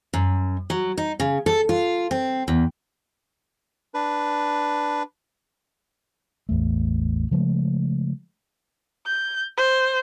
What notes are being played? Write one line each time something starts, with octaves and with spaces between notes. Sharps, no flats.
F#2
F#3
D#4
C#3
A4
F4
C4
E2
D4 B4
A1 E2 A3
C#3 F3 G#3 A3
G6
C5